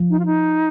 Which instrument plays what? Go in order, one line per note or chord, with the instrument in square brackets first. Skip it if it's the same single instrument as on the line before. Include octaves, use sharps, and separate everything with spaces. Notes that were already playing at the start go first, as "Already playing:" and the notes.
Already playing: [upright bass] F3
[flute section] D#4
F4
D#4